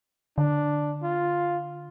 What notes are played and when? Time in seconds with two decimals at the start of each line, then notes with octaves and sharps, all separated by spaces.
0.38 D3 D4
1.03 F4